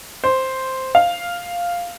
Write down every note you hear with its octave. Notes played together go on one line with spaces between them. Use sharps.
C5
F5